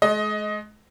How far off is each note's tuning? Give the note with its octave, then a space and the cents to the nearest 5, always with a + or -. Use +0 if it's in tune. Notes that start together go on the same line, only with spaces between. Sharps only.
G#3 +40 D#5 +15